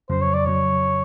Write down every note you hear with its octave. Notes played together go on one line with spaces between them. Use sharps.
F2 C#3 F#3 C5
C#5
D5
F2 C#3 F#3 C#5